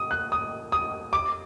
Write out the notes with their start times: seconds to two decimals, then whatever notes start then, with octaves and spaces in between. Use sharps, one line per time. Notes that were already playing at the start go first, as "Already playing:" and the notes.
Already playing: D#6
0.11 F#6
0.32 D#6
0.72 D#6
1.13 D6